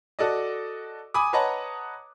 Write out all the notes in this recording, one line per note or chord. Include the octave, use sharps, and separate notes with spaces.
F#4 A4 D5 D#5
G#5 B5 D6 D#6
B4 C#5 D#5 F#5 A5 A#5